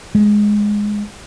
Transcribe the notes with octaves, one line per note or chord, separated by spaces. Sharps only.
G#3